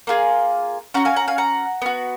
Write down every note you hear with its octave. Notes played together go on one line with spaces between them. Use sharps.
A#3 F4 G#4
C#4 F#4 F#5 A#5
F5 G#5
F#5 A#5
F5 G#5
F#5 A#5
B3 F#4